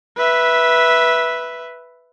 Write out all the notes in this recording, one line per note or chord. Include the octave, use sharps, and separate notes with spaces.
B4 E5